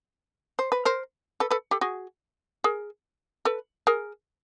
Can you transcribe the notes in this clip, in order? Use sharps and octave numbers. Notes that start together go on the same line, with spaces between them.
C5
B4
A#4 C5
A4 B4
A4 B4
G4 A4
F#4 G#4
G#4 A#4
A4 B4
G#4 A#4